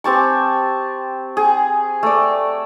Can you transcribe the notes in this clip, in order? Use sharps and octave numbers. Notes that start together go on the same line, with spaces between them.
C4 G4 A5 C#6
G#4
A3 D5